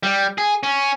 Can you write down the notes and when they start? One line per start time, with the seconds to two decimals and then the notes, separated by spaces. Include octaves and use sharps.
0.03 G3
0.38 G#4
0.63 C#4